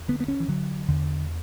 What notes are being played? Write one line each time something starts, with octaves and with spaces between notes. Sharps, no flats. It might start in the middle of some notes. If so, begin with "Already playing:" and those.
Already playing: E2
D3 B3
B3
C#4
E3
D3 F#3
E2 D3